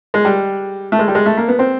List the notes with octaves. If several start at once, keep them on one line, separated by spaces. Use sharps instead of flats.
G#3
G3
A3
G#3
G3
G#3
A3
A#3
B3
C4